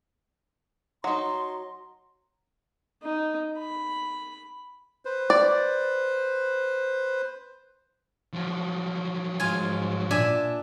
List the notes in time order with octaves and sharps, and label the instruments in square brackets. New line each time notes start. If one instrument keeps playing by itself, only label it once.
[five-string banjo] F#3 D#4 [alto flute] C6
[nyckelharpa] D#4
B5
[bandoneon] B4 C5
[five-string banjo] D5
[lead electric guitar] F3 F#3
[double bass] G#2 [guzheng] F4 G#5
[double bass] A#2 [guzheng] D4 E5 G#5